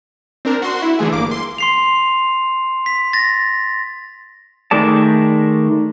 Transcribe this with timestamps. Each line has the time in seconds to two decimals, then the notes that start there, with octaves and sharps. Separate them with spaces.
0.45 C4 D4 A#4
0.62 F#4 C6
0.82 E4
0.99 D3 E3 A3 G#4
1.12 G1 A#3 D6
1.31 C6
1.58 C6 C7 F7
2.86 B6
3.13 A6 A#6
4.71 D#3 G#3 A3 D5 A5